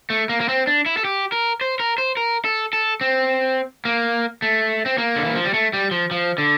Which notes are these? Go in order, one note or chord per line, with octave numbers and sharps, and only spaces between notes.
A3
A#3
A#3
C4
D4
E4
A4
G4
A#4
C5
A#4
C5
A#4
A4
A4
C4
A#3
A3
C4
A#3
D3
E3
F3
G3
A3
G3
F3
F3
D3